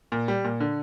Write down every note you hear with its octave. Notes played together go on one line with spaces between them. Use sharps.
A#2
G3
A#2
D3